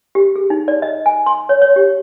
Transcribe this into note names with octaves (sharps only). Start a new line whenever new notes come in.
G4
G#4
D#4
D5
D#5
G#5
C6
C#5
C#5
G4